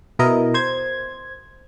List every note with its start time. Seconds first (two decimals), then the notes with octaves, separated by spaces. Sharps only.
0.19 B2 E4 A#4 D#5
0.54 C5 G#6